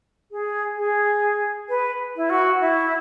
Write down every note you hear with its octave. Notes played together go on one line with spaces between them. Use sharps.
G#4
G#4
B4
E4
F#4
E4